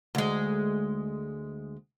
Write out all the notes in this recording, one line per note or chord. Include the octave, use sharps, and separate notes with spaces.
D2 G#3